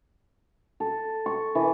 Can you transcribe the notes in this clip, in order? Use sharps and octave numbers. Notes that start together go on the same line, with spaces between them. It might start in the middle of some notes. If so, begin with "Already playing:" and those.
A4
C#6
E3